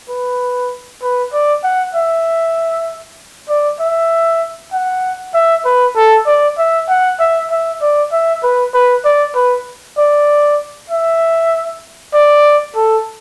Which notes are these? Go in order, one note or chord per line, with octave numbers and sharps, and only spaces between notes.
B4
B4
D5
F#5
E5
D5
E5
F#5
E5
B4
A4
D5
E5
F#5
E5
E5
D5
E5
B4
B4
D5
B4
D5
E5
D5
A4